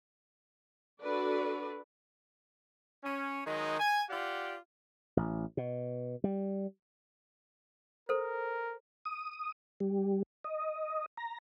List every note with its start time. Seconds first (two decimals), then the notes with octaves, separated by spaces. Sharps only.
1.01 D4 F#4 A4 B4 D5
3.04 C#4
3.46 D#3 F#3 G#3 D#4
3.79 G#5
4.10 F4 G4 D5 F#5
5.17 A1
5.57 B2
6.24 G3
8.09 A4 A#4 C5
9.05 D#6
9.80 G3
10.44 D#5
11.17 A#5